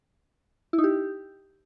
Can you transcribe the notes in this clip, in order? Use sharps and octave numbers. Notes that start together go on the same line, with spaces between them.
E4
D#4
G4